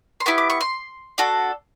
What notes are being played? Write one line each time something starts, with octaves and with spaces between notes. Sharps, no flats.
C6
B3 E4 G4 C#6
D6
C#6
C6
D4 F#4 A4